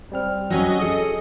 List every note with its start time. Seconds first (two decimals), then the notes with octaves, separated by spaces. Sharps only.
0.12 G3 C4 F6
0.50 F#3 C#4 F#4 D#5
0.80 G#4 A4 D#6 C#7